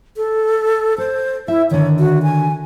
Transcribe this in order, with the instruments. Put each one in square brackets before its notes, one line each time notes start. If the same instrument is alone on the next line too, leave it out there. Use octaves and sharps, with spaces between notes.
[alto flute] A4
[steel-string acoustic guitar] A4 [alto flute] C5
[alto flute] E4 [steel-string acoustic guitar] E5
[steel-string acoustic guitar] D3 D#3 [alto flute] C#5
[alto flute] F#4
G#5